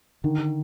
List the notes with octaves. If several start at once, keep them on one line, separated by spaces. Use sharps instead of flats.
D3 D#3